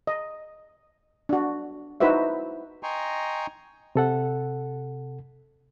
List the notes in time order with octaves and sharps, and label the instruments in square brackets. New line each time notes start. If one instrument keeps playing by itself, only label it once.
[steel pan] D#5
D4 F#4
D#4 E4 F#4 B4 C5 E5
[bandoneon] D#5 G5 G#5 A#5 C6 C#6
[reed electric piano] C3 A4 F#5